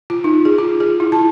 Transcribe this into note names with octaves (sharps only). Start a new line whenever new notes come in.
F4
D#4
G#4
F4
G#4
E4
A5